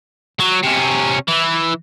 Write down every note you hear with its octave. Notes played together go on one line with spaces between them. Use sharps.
F#3
C3 C#4
E3